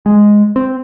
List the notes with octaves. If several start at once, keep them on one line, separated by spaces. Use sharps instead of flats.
G#3
C4